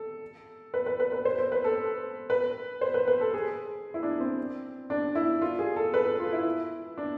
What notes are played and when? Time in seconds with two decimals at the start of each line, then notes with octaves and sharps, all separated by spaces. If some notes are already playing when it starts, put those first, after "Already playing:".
Already playing: A4
0.74 B4
0.86 B4
1.00 B4
1.12 B4
1.25 C5
1.38 C5
1.52 B4
1.64 A4
2.30 B4
2.81 C5
2.94 B4
3.08 B4
3.21 A4
3.34 G#4
3.94 E4
4.03 D4
4.20 C4
4.90 D4
5.15 E4
5.42 F4
5.59 G#4
5.76 A4
5.94 B4
6.06 A4
6.20 F4
6.33 E4
6.98 D4